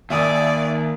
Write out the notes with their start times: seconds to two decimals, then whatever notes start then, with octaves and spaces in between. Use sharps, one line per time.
0.10 D#2 D5 E5 G#5 D#6